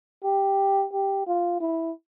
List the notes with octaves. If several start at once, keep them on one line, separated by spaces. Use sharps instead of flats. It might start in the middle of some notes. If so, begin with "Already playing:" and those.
G4
G4
F4
E4